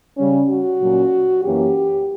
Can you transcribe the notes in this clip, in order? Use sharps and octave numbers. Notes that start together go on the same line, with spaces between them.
C#3 G3 C#4
F#4
A#2 F#3 C#4
F#2 E3 A#3 C#4 G4